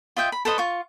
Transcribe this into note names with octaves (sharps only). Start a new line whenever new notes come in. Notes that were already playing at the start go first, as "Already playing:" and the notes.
F4 D#5 E5 G5
B5
A4 B4 C5 D#5
F4 C#6